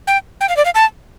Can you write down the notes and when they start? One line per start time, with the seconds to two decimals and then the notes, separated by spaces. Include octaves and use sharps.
0.07 G5
0.41 G5
0.49 F5
0.56 D5
0.65 F5
0.75 A5